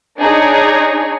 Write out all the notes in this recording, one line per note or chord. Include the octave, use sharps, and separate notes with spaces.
D4 D#4 G#4 C#5